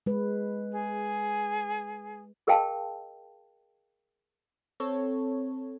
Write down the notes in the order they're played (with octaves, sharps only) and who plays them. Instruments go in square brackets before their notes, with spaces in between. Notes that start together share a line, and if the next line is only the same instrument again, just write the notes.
[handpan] G#3 B4
[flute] G#4
[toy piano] G#4 A#4 D#5 F5 G5 A5
[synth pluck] C4 A4 C#5